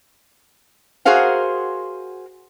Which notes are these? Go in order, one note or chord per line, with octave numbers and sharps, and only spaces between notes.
F#4 G#4 A#4 C5 F5 F#5